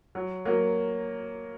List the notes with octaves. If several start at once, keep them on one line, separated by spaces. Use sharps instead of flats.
F#3
F#3 A#3